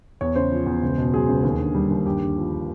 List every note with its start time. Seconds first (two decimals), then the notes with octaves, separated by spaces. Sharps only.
0.21 E2 C#5
0.36 C#3 C5
0.51 F3
0.66 E2
0.83 C#2
0.97 B2
1.14 F#3 G#4
1.29 C#2
1.43 D#2
1.59 D3
1.75 G3
1.90 D#2
2.05 G2 G4
2.21 D3
2.37 F3